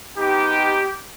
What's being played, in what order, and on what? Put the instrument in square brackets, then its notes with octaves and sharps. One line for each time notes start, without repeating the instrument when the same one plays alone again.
[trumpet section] G#3 B3 D#4 G4